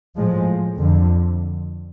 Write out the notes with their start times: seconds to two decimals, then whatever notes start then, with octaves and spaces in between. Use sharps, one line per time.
0.16 A2 F3 G#3
0.78 F2 D3